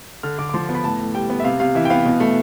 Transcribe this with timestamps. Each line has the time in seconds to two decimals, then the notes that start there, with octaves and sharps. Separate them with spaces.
0.23 D3 F6
0.39 D3 D6
0.49 D6
0.54 F3 C6
0.69 B3
0.75 B5
0.84 A2 A5
0.99 A2
1.14 G3 G5
1.30 B3
1.40 E5
1.44 C3 F5
1.60 C3 F5
1.75 E3 E5
1.85 G5
1.90 B3 F5
2.05 B2
2.20 A3